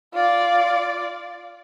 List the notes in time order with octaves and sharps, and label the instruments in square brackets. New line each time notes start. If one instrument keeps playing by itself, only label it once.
[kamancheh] F4 D5